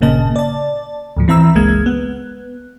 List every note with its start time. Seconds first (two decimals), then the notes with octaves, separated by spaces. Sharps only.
0.01 G1 A#2 C#3 A#3 D#5 A5
0.36 D5 A5
1.17 D2 A2 F3
1.28 E3 C4 E5 A#5 E6
1.55 G1 C#2 G#3 A#3 G#6
1.86 B3